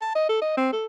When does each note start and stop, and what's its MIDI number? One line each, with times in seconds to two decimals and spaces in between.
0.02 0.13 81
0.15 0.24 75
0.29 0.40 69
0.42 0.54 75
0.57 0.69 60
0.72 0.86 69